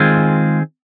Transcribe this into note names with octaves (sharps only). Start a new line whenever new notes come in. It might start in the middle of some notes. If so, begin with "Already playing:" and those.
Already playing: D#3 G#3 C4 F4 G#4